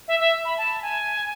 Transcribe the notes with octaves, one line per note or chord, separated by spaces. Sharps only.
E5
E5
B5
A5
G#5